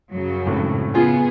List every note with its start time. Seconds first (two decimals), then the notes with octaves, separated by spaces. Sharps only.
0.12 F#2 C#3 F#3
0.46 G#1 A2
0.95 C#3 B3 F4 G#4